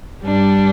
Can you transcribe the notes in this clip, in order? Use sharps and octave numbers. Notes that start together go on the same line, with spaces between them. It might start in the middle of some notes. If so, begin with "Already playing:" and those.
G2 G3 D4